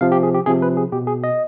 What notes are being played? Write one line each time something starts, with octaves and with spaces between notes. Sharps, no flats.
C3 F3 F5
G4
G#4
G4
C3 F3 G#4
B4
G#4
B2 G4
G#4
D#5